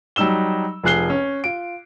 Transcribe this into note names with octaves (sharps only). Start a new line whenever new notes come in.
F#3 G3 D#4 E6 E7 G7
F1 F3 G#4 F#6 C7 G7
C#4
F4 D7